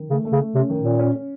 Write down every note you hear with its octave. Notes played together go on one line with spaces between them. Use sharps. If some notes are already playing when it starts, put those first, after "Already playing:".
Already playing: D#3
C#3 A3
A3
C#3
A3
C3 C#4
D#3
A#2
C#4
C#4
C#4